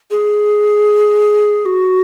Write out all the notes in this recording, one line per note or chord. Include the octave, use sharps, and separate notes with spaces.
G#4
F#4